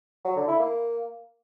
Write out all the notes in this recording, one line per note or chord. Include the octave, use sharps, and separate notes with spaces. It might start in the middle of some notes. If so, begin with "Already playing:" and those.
F#3
D3
E4
A#3